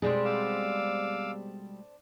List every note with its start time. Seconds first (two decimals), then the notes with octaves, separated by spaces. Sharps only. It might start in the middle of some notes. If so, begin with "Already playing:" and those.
0.02 B2 G3 G#3 C4 D4 G#4 A4
0.25 F5 D6 E6